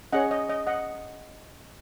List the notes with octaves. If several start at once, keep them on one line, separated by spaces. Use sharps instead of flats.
C#4 G#4 C#5 D#5 F#5
D#5
D#5
D#5 F#5